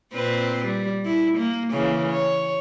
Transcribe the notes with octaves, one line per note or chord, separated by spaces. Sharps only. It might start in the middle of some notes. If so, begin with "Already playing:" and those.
A#2 C4 B4
G3
E4
A#3
C#3 E3 A#3
C#5